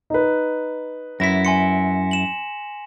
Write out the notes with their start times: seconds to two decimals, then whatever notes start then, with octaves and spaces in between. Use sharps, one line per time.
0.10 D#4 B4
1.20 F#2 E4 A#6 B6
1.45 G#5 C6 C#7
2.11 E7 F#7